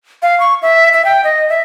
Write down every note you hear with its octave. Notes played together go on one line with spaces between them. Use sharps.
F5
C#6
E5
E5
G5
D#5
E5